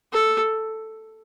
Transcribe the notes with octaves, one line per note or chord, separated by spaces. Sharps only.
A4